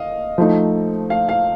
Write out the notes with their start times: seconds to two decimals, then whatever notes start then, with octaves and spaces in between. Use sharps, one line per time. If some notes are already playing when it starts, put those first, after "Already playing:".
Already playing: D#5 F5
0.38 F3 A3 D#4
1.10 F5
1.29 F5